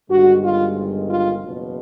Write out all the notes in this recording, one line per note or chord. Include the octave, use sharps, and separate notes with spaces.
G1 G2 D#3 G#3 F#4
F4
F4
F#1 E2 B2